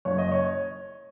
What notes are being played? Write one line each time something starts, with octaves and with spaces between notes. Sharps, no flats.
F#1 C#5
D#5
C#5